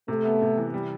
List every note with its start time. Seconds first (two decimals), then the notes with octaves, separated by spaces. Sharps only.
0.08 C3 A3
0.25 B3
0.42 C3
0.57 E3
0.74 G3